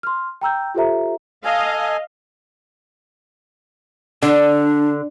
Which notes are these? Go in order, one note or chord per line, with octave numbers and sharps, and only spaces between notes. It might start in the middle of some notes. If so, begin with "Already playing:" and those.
C6 F6
G5 A#5 E6 G6
F4 G4 A4 C5 E5 A#5
A4 D#5 F5 G#5
D3 D4